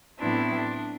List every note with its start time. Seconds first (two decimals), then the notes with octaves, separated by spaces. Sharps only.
0.19 A2 F#3 B3 C4 D4 E4
0.55 D4